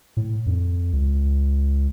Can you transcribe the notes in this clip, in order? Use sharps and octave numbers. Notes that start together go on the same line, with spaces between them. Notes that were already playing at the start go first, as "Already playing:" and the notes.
A2
F2
C#2